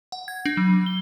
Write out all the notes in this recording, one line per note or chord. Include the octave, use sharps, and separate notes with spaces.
F#5
G#6
D4
F#3
G7